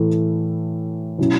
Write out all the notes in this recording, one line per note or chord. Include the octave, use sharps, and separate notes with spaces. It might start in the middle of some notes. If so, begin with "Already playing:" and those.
Already playing: A2 E3 A3
B2 F#3 C#4 E4